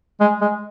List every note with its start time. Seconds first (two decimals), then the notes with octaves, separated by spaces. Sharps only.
0.21 G#3
0.41 G#3